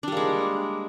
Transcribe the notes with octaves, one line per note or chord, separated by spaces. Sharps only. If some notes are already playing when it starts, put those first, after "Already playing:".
G3 G#3 A#3 D4